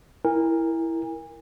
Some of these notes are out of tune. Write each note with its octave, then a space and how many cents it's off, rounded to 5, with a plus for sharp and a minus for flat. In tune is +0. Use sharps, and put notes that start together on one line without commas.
E4 +0 A#4 +0 G#5 -35